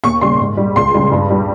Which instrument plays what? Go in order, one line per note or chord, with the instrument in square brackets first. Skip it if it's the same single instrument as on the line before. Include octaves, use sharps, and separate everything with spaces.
[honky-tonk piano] D#2 C#6
C#3 G3 C6
G#2
G3
C#2 C6
C#3 G3
G2
G3